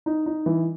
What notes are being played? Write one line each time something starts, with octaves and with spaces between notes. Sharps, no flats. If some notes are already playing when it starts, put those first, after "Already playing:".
D#4
D#4
E3